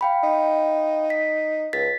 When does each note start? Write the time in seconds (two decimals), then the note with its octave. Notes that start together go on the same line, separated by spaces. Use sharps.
0.01 F5 G5 B5
0.23 D#4
1.10 B6
1.73 C#2 A6 B6